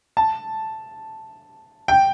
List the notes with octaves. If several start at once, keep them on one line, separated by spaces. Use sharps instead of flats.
A5
G5